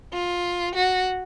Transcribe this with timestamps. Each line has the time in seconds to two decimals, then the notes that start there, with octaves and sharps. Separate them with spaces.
0.13 F4
0.75 F#4